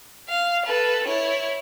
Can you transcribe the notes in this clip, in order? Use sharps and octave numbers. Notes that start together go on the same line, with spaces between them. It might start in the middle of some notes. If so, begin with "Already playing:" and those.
F5
A4 B4
E4 C#5